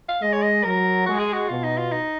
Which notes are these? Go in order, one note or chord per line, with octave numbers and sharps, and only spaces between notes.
F5
G#3 D#5
C#5
D#5
F#3 A#4
G#3 F#4
G#4
F#4
B2 F4
D#4
F4
D#4